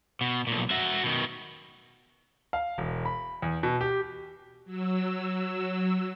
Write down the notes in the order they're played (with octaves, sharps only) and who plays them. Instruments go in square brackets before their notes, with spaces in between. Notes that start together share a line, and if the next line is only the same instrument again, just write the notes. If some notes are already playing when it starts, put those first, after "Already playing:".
[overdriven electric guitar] B2
B1 A#2
F#4 E5
B2 D#3
[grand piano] F5
E1
B5
E2
B2
G4
[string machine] F#3 E6